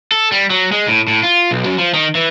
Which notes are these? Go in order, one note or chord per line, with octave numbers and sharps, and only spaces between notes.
A4
G3
F#3
G#3
A2
A2
F4
B1
F#2
F3
D#3
E3